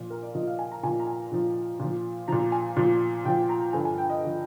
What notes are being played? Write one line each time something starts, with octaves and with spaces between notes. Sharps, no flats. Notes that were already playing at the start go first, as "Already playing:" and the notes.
Already playing: A#2 F3
A#4
D5
A#2 F3 D#5
F5
G#5
A#5
A#2 F3 G#5
A#5
G#5
A#2 F3
A#2 F3
A#2 F3 A#5
G#5
A#2 F3
A#2 F3 G5
A#5
G2 D3 F3 G#5
G#5
G5
D#5
D3 F3